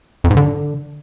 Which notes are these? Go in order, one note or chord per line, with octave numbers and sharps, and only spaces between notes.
F2
G#2
D3